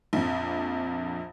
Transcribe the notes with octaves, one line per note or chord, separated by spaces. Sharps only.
A#1 F2